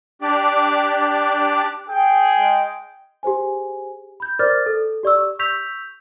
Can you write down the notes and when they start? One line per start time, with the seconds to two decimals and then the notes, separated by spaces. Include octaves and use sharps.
0.22 D4 G4 D5
1.89 G#4 G5
2.38 G#3
3.23 G4 G#4 C5 G#5
4.20 B5 G6
4.39 A#4 C5 D5 D6 F6 A6
4.66 A4
5.03 G4 D5 C#6 E6
5.39 C#6 E6 G6 B6 F7